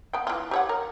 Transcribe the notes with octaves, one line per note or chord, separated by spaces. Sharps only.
B3 G5
E3 F4
G4 C#5 F#5
A#4